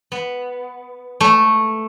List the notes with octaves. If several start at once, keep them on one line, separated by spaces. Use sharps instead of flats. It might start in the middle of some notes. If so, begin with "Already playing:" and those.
B3
A3